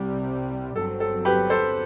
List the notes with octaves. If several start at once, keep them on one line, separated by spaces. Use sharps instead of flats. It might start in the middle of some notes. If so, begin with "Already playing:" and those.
Already playing: C2 C3 G3
G1 G2 F#3 C4 A4
A4
G4 B4
A4 C5